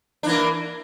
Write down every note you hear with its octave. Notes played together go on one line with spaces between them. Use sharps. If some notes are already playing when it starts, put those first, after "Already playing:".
E3 A#3 D4